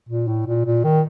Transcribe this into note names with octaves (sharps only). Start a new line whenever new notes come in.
A#2
A2
A#2
A#2
D#3